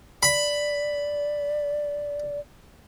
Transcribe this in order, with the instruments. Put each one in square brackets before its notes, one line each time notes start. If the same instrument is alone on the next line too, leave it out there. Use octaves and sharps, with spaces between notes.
[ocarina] D5 [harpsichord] B5